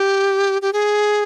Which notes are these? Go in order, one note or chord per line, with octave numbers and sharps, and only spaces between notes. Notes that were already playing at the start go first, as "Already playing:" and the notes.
Already playing: G4
G4
G#4